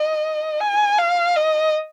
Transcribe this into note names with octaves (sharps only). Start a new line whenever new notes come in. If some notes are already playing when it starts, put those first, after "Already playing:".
Already playing: D#5
G#5
F5
D#5